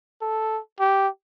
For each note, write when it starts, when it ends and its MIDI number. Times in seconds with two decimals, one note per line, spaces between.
0.21 0.60 69
0.80 1.08 67